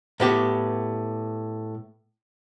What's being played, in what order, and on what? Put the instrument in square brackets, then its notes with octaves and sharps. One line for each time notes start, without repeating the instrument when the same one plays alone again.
[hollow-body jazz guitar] A2 B3 G4